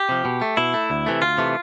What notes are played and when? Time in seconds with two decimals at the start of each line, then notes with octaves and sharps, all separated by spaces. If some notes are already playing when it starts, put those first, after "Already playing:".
Already playing: G4
0.09 C3 F3
0.25 B2
0.42 A3
0.57 B2 E4
0.74 A3
0.90 D2
1.06 C3 E3 A3
1.22 D2 F4
1.38 C3 E3 A3